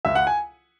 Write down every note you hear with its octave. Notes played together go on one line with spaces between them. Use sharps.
C#2 E5
F#5
G#5